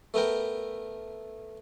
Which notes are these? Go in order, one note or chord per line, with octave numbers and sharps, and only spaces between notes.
A3 B3 A#4 G5